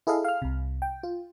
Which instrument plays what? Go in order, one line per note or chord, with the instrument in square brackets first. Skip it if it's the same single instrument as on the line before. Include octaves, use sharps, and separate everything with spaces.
[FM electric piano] E4 G#4 A4 D#5 F5
F5 F6
C2 C3
G5
F4